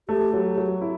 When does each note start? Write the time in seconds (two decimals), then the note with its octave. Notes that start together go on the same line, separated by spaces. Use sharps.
0.09 A3 G4
0.34 F#3
0.58 F#3
0.82 E4